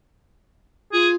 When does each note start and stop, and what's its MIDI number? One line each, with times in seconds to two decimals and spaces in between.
0.93 1.15 65
0.93 1.08 68